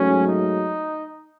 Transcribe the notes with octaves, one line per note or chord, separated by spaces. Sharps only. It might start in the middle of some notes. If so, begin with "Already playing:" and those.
Already playing: G#2 F#3 A3 C#4
D#4